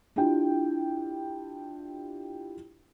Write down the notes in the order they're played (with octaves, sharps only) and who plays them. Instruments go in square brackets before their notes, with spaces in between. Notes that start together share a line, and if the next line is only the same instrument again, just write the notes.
[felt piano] D4 E4 F4 G4 G5